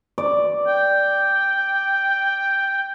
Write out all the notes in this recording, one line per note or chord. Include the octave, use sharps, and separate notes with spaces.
D5
G5